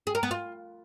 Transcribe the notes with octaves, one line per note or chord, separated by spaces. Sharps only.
G#4
A#4
B3
F4